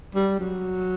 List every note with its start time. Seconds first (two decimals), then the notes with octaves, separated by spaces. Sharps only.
0.15 G3
0.39 F#3